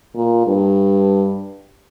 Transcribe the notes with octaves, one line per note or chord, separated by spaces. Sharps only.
A#2
G2